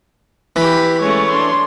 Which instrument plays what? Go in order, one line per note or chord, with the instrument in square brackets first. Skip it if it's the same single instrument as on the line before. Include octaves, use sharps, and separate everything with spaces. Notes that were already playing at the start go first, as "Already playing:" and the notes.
[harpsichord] E3 [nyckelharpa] G4 B5
[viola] G#3 C#4 [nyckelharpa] A3 C#5
[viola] D4 C6